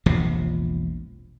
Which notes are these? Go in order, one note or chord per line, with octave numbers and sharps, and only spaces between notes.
E1 A#1 C3 F3